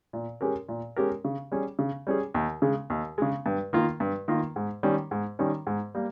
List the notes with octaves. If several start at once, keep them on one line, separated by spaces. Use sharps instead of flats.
A#2
G#3 C#4 G4 A#4
A#2
G#3 C#4 G4 A#4
C#3
G3 C#4 G#4
C#3
G3 C#4 G#4
D#2
C#3 G#3
D#2
C#3 G#3
G2
D#3 A#3 F4
G2
D#3 A#3 F4
G#2
D#3 G3 C#4
G#2
D#3 G3 C#4
G#2
G3 A#3